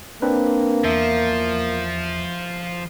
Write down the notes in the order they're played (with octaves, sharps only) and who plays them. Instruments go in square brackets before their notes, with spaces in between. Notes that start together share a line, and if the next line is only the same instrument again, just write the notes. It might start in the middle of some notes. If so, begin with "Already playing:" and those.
[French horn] A#3 [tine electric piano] C4 D4 B4
[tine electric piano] E2 E5 [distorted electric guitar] F3